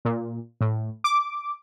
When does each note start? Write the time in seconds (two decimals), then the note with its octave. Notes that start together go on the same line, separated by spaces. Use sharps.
0.05 A#2
0.61 A2
1.04 D6